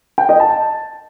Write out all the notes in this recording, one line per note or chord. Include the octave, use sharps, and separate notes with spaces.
G5
D#5
A5